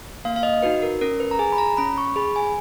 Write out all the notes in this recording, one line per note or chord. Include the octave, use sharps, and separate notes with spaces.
A#3 F5
F5
D#5
D#4 F#4 B4
A#4
C#4 A#4
B4
A#5
G#4 G#5
B5
A#5
C#4 B5
C#6
G#4 B5
G#5